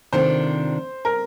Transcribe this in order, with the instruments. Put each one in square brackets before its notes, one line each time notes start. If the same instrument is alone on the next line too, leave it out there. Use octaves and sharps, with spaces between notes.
[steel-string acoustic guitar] C3 D#3 A3 D4 F4 [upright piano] C5
[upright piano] A#4